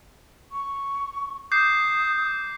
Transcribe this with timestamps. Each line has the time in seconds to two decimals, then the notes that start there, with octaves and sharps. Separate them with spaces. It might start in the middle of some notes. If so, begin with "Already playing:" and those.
0.52 C#6
1.52 D6 D#6 G6 C7